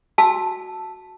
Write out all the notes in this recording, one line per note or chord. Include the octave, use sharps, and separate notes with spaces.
F#4 A5 E6